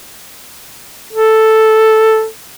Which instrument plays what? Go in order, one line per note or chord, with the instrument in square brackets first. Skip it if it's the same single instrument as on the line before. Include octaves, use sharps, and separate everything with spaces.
[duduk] A4